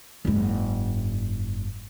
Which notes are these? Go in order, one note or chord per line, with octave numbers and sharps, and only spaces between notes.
F#1 G#2